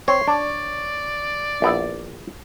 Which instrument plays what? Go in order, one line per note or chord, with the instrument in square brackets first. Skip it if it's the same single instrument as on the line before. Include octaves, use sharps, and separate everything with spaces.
[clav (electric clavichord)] C4 [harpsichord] C#5 [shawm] C6
[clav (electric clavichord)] D4 [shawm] D5
[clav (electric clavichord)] A#1 B3 E4